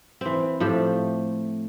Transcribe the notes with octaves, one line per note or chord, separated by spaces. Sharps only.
E3 C4
A2 F3 A3 G4